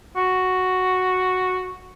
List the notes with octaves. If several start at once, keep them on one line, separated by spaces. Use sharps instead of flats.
F#4